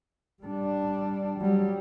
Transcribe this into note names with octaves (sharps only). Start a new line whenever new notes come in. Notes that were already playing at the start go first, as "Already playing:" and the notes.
G3 D4
F#3 G3